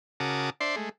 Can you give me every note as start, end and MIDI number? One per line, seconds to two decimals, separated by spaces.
0.20 0.50 49
0.20 0.50 66
0.20 0.50 70
0.20 0.50 81
0.20 0.50 86
0.20 0.50 87
0.61 0.76 62
0.61 0.76 72
0.61 0.76 74
0.61 0.76 76
0.61 0.76 84
0.76 0.89 56
0.76 0.89 57